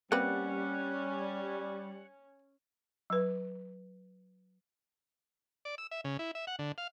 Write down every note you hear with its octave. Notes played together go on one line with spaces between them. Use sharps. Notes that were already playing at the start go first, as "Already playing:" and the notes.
G3 A#3 C4 C#4 B4 F#5
F#3 B4
D5
E6
E5
C#3
E4
E5
F#5
D3
F5